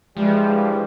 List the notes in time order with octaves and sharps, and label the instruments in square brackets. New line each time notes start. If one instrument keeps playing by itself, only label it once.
[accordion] G2 E3 G3 [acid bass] F3 [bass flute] G#3 [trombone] G4